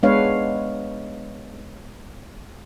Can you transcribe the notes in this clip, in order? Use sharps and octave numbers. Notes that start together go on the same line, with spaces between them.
G#3 B3 D4 B4 C#5 F5